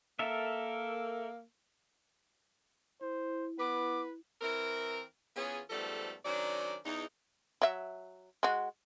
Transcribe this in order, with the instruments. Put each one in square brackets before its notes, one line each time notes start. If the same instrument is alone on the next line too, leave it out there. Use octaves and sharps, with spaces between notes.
[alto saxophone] A#3 [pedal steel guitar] A4 A#4 E5
[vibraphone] E4 [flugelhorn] C5
[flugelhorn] B3 [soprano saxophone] B4 [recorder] D6
[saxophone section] E3 C4 E4 A#4
E3 B3 C#4 F4 G#4
G#2 F3 G3 A3 B3 A4
D#3 F#3 C#4 D4 C5 D5
E2 D#4
[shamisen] F#3 E5
G#3 F#4